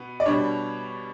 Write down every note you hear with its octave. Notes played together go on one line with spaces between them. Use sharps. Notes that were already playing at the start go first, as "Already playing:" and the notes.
Already playing: B2 B3
D5
B2 G3 D4 C#5